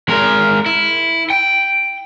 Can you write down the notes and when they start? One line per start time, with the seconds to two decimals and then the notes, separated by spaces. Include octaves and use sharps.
0.09 G#3 A#4
0.66 E4
1.30 G5